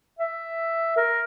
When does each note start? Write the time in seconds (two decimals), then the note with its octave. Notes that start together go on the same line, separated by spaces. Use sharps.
0.19 E5
0.97 A#4